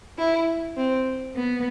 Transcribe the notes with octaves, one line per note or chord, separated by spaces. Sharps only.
E4
C4
B3